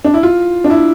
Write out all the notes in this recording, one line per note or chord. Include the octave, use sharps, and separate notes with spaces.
D4
E4
F4
D4
E4